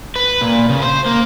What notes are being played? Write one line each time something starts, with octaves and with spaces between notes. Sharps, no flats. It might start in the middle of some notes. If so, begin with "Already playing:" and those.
B4
A#2
C#3
C5
A#3